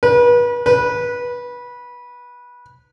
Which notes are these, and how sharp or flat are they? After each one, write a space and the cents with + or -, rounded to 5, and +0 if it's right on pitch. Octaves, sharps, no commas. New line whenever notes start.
B4 -35
B4 -20